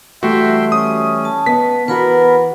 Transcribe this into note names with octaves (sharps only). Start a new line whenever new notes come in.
E3 G3 A3 F#4 E5 G5 C6
C#4 D#6
A5
B3 D#5 B6
E3 B3 F#4 A#4 B4 B5